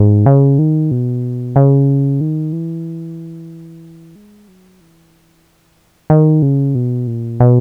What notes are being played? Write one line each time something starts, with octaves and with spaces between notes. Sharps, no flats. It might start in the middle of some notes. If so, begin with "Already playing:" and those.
Already playing: G#2
C#3
D#3
B2
C#3
D#3
E3
G#3
F#3
E3
D#3
C#3
B2
A#2
B2